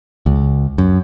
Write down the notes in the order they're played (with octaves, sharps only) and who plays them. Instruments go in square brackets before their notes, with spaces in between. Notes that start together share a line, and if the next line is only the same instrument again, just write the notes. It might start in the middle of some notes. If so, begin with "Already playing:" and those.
[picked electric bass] C#2
F#2